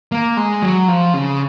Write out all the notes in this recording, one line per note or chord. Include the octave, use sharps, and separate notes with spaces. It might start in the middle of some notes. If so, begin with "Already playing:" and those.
A#3
G#3
F#3
F3
C#3